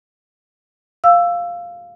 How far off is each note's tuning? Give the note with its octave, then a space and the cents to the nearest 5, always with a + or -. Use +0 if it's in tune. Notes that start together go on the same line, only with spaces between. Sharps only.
F5 +0 E6 +10